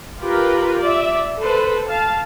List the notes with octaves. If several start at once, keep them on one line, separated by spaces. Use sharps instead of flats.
F4 G4 A#4 B4
D5 E5
A4 B4 C5
F5 A5